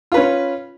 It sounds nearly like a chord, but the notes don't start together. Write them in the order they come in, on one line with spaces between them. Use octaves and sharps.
F4 B4 C#4